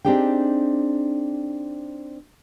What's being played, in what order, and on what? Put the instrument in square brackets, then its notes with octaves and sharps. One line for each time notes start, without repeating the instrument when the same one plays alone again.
[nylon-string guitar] C4 D4 D#4 G4 G#4 G5